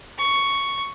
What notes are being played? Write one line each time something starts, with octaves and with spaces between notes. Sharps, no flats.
C#6